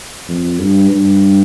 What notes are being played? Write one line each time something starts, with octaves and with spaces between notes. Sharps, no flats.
F2
G2
G2